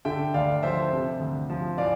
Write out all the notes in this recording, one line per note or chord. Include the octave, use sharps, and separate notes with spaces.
D3 E5 G5
D2 D5 F5
F3 C5 E5
C3
D2
F3
E3 D5 F5